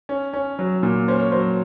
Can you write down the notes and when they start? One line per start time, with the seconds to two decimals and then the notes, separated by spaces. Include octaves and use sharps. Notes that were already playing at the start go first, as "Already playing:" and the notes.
0.09 C#4
0.33 C#4
0.59 F#3
0.83 A#2
1.08 C#4 C5
1.20 C#5
1.32 F#3 C5